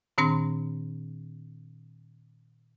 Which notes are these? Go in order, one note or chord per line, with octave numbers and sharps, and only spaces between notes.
A#2 D#3 C4 D4 C6 A#6